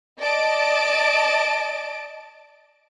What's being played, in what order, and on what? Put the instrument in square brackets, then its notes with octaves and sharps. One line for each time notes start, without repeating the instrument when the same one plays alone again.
[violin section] D5 D#5 A5 D7